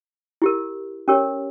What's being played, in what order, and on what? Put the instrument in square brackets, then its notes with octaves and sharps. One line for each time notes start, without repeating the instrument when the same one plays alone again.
[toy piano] E4 G4 A#4
C#4 G4 A#4 C#5